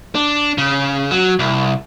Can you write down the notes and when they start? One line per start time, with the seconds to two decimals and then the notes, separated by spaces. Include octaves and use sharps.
0.15 D4
0.58 C#3
1.11 F#3
1.39 C2